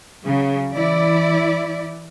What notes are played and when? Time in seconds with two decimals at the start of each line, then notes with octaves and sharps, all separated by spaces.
0.23 C#3 F#3
0.71 E3 E4 D5